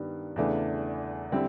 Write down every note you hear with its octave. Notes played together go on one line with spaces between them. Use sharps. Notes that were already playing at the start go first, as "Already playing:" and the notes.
Already playing: G2 D#3 G3 B3
E2 C#3 E3 A3 D4
D3 G3 C4 E4